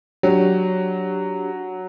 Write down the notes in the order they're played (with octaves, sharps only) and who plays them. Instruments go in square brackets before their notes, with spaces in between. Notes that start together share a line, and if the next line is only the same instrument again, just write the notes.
[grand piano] F#3 [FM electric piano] D4 G4 C#5